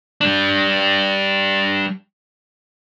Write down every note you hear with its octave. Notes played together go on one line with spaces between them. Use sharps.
G3 D4